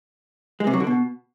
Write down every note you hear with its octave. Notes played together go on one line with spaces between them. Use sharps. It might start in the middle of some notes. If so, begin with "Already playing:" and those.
G#3
C3
F#3
D3
B2